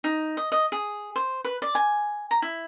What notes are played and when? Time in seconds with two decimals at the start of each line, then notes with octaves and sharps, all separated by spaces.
0.04 D#4
0.37 D#5
0.52 D#5
0.72 G#4
1.16 C5
1.45 B4
1.62 D5
1.75 G#5
2.31 A#5
2.42 E4